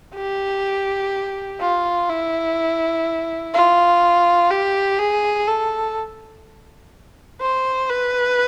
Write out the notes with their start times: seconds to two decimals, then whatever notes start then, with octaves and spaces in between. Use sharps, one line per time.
0.14 G4
1.60 F4
2.09 E4
3.54 F4
4.51 G4
4.99 G#4
5.47 A4
7.41 C5
7.89 B4